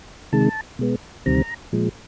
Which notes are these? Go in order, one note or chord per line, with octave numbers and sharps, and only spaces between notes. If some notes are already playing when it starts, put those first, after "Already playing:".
C3 D#3 G#3 A5
B2 G#3 B3
D2 C3 D#3 G3 C4 A#5
A#2 F3 G#3